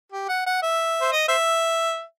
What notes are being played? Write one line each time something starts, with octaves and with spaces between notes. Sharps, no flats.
G4
F#5
F#5
E5
C5
D#5
C5 E5